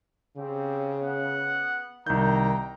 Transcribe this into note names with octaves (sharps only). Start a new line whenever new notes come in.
C#3 C4 G4
B3 F#5
C2 D#3 G5 A#5 G6